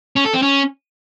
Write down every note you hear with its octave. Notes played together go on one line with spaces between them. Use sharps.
C#4
A4
C4
C#4